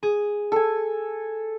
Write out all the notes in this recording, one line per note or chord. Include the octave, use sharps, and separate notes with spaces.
G#4
A4 G#5